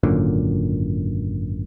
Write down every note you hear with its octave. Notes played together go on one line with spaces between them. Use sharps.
G#1 F#2 A#2 D3